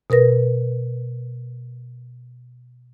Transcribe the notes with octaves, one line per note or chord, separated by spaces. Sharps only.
B2 A#4 B4 A#6